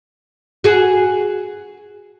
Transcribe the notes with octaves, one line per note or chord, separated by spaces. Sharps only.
F#4 G#4